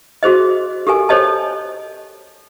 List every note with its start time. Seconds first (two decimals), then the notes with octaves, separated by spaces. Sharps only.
0.23 F#4 G#4 C5 D#5
0.87 G4 A4 A#4 G#5
1.09 A4 C5 C#5 D#5 A5